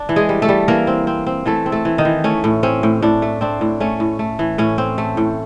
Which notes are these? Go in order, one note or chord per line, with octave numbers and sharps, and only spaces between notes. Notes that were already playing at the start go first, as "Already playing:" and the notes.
Already playing: D4
E3
G#3 G#4
G3
A3 A4
G3
E3 A#3 A#4
C4
C4
C4
E3 A3 A4
C4
A3 A4
E3
D#3 D#4
E3
A3 C#4
A2
C4 C#4
A2
A2 D4
A3
C4 D4
A2
A3 C#4
A2
A3
E3
A2 C#4
C4
A3
A2